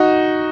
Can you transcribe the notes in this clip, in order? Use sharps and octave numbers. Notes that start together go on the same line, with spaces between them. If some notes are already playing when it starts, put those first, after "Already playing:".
Already playing: D#4 F#4